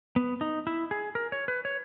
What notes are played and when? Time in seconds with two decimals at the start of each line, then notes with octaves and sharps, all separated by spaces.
0.16 B3
0.41 D#4
0.67 E4
0.91 G#4
1.15 A#4
1.32 C#5
1.48 B4
1.65 C#5